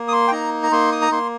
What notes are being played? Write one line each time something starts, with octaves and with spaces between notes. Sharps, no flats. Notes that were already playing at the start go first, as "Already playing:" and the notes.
Already playing: A#3
D#6
C6
G5
D#4 A#5
A#5
A#3 C6
D#6
A#5
A#3 C6